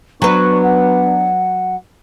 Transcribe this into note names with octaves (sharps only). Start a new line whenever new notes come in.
F#3 B3 D4 B4 C#6
F#5